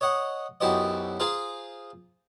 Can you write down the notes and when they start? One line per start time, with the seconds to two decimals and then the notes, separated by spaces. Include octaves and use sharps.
0.01 C#5 D#5 F#5
0.61 B1 F#2 E4 G4 C5 D#5
1.20 F4 G#4 C5 F5 A#5 C6